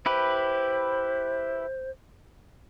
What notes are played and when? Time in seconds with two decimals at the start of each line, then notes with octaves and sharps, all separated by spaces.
0.06 E4 G4 B4 C5